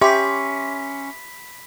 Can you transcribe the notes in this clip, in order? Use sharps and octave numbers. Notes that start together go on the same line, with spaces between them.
C#4 G4 E5 B5 C6 D6 B6